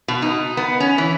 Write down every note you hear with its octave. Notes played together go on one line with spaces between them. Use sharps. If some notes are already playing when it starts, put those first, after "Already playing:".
B2
D#4
B3
C#4
E3